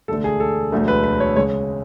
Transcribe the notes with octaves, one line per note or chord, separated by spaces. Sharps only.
E1 D2 D3 A3 A4
G#4
A4
E1 D2 D3 F#3 A3
B4
B4
C#5
C#3 G#3 C#5